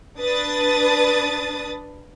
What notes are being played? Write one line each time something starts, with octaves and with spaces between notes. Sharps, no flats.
D4 B4 D#6 A6